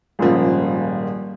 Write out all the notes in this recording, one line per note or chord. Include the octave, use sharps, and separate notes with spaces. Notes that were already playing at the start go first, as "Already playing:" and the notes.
D#1 G#1 C#3 F3